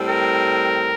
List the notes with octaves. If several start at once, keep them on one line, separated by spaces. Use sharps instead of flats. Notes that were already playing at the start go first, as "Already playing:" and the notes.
Already playing: A2 G3 C4
A#4